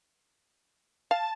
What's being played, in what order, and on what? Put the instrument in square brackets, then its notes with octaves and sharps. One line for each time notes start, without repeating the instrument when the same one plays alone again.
[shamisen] F5 [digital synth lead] A5